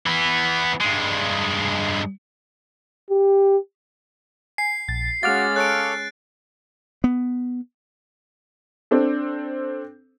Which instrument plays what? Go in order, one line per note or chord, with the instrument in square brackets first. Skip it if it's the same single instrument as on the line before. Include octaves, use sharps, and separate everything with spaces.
[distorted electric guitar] E3 B3
G2 G#3
[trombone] G4
[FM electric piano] G#5 [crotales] C7
[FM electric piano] A#1 A6
[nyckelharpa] G#3 C#4 [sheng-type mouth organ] F#4 [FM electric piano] F5 D6 F6 [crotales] A6
[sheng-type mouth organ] A4 C#5 [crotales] F#6 D7
[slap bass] B3
[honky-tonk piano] C4 D4 A4